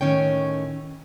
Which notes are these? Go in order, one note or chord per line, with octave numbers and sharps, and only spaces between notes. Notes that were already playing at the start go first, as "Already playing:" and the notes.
A2 D#3 C#4 C#5 G5